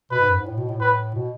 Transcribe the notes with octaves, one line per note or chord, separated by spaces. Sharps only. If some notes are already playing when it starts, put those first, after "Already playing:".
B2 B4
G#2
F#2
G#2
A2
B2
A2
A2 B4
B2